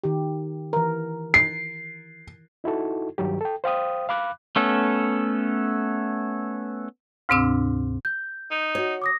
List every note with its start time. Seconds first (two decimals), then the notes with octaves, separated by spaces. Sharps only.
0.04 D#3 G4
0.73 E3 A#4
1.34 C7
2.64 D#4 E4 F#4 A4
3.18 G2 D#3 F#3 G4
3.41 A4 G5
3.64 C5 F5 G5 D#6
4.09 F5 B5 D6 F#6
4.56 A3 B3 C#4 A4
7.29 D2 G#2 C3 C4 D4 E6
8.05 G6
8.51 D#4
8.75 F#4 C#5
9.02 D6 D#6 A#6